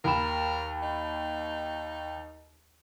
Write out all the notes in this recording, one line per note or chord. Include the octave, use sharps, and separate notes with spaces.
D#2 A#4 B5 E7
D#4